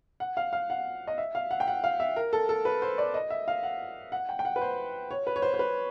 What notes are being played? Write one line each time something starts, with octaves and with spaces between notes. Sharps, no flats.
F#5
F5
F5
F#5
D#5
E5
F5
F#5
G5
F#5
F5
E5
A#4
A4
A4
B4
C5
D5
D#5
E5
F5
F#5
F#5
G5
G5
F#5
B4
C5
C#5
B4
C#5
C5
C5
B4